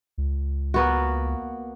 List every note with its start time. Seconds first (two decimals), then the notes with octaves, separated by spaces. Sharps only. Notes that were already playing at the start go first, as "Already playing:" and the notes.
0.18 C#2
0.74 A#3 B3 F#4